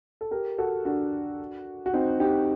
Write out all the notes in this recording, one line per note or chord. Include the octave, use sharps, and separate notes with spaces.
A4
G4 A#4
F#4 A4
D4 F#4
F#4
C4 D#4
D#4 G4